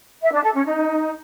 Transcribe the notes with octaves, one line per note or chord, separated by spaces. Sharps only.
E5
D4
A4
C#4
D#4